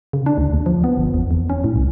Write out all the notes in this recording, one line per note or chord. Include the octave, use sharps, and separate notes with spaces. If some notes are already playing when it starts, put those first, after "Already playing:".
C#3
D4
D2
D#2
F3
B3
G1
E2
E2
C#4
A2
C2